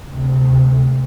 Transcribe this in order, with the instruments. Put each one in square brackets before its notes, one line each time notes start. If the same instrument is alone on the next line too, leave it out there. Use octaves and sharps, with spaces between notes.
[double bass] D2 C3